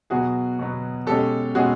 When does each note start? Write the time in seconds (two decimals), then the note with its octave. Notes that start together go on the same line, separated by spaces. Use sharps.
0.10 B2 F#3 B3 F#4 G#4
0.59 B2 F#3 B3
1.07 B2 G#3 C#4 G4 A4
1.55 B2 G#3 C#4 F#4 G#4